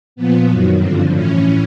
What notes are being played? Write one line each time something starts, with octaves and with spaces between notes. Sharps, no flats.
A#2 F3 B3
F#2 D#3 F#3
G2 D3 F3 C4
A2 E3 C#4